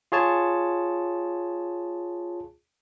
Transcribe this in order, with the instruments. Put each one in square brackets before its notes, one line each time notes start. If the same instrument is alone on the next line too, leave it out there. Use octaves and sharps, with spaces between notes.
[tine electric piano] F4 G#4 C#5 A5